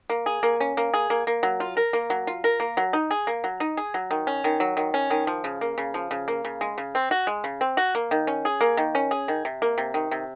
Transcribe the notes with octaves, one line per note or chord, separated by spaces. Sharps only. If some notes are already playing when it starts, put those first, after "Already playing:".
A#3
G#4
A#3
C#4
A#3
G#4
A#3
A#3
F#3
F4
A#4
A#3
F#3
F4
A#4
A#3
F#3
D#4
G#4
A#3
F#3
D#4
G#4
F#3
D#3
C#4
D#3
F#3
D#3
C#4
D#3
F3
C#3
A#3
C#3
F3
C#3
A#3
C#3
G#3
C#3
C4
F#4
G#3
C#3
C4
F#4
A#3
D#3
C#4
G#4
A#3
D#3
C#4
G#4
D#3
C3
A#3
C3
D#3
C3